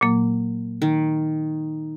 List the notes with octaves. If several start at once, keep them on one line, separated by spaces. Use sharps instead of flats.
A#2 F#3 A#3
D#3